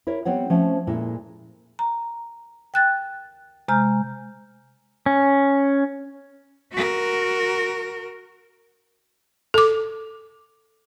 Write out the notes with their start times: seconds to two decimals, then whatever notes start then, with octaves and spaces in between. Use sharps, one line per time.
0.07 E4 A#4 C#5
0.25 G3 B3 C4 C#5 F#5
0.50 F3 A3 C4 C#4
0.87 A#2 G#3 E4 A4
1.79 A#5
2.74 G5 F#6 A6
3.68 C3 G#3 A#5 F6 G6
5.06 C#4
6.72 F#4 A#4
9.54 A4 D6